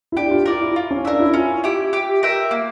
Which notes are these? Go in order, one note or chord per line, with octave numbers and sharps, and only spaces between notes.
E4
D4 G4
F4
F4 A#4 D5
E4
F4
C#4
D4 A#4 E5
E4
C#4 F4
E4 G4
G4
A#4 E5 G5
A#3